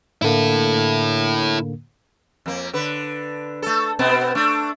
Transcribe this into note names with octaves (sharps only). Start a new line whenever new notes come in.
A2 D3 A#3 E4 A4
F2 A#3
D3 B4
A3 A4
B2 B3 C4
A3 D4